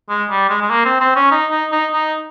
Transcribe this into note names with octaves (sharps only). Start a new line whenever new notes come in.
G#3
G3
G#3
G#3
A#3
C4
C4
C#4
D#4
D#4
D#4
D#4